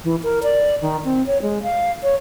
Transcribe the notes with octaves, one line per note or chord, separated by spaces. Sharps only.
E3
A#4
D5
D#3
C4
C#5
G#3
F5
C#5